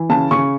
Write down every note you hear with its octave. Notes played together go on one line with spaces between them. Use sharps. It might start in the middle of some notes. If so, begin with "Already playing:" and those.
Already playing: E3
C#3 A5
C#3 C#6